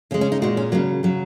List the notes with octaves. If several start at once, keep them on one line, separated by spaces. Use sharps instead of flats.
C#3 G#3 C#4
C#4
D#4
A#2 G#3 F#4
C#4
C#3 F#3 A#3
C#3 F#3